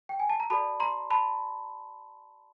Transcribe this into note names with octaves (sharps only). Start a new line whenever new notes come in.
G5
G#5
A5
A#5
F#4 A4 D5 A5 B5
A#5 C6
A5 B5